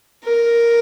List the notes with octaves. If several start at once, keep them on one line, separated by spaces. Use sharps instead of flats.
A#4